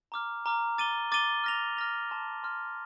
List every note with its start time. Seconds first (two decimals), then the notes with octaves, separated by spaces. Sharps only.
0.12 A#5 D6 F6
0.46 A#5 D6 F6
0.78 D6 A6 D#7 G7
1.12 D6 A6 D#7 G7
1.44 F6 A#6 F7
1.77 F6 A#6 F7
2.09 A5 C6 F6
2.43 A5 C6 F6